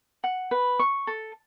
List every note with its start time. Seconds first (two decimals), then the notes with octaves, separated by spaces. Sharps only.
0.24 F#5
0.51 B4
0.79 C#6
1.07 A4